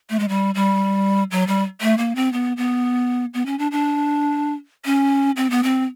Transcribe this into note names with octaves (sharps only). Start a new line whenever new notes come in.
A3
G#3
G3
G3
F#3
G3
A3
A#3
C4
B3
B3
B3
C#4
D4
D4
C#4
C4
B3
C4